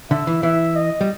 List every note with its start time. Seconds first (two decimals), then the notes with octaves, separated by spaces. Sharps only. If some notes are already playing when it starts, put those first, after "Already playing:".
0.10 D3 E5
0.27 E3
0.43 E3 E5
0.76 D#5
1.01 G3